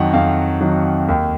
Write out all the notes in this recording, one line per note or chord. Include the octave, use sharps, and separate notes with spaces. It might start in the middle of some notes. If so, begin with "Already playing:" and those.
Already playing: F2 D#3 F#3 F#5
F2 F5
D#3 F#3
D#2